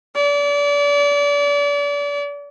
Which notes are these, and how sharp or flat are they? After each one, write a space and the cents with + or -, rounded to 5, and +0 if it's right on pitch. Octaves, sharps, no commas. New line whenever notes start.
D5 -35